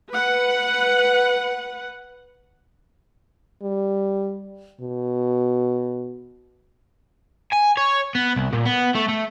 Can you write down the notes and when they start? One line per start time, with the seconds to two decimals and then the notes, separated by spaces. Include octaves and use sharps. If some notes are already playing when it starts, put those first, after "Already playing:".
0.13 B4 F#5
3.62 G3
4.81 B2
7.53 G#5
7.77 C#5
8.15 B3
8.36 C2
8.53 A#2
8.66 B3
8.95 A3
9.09 A3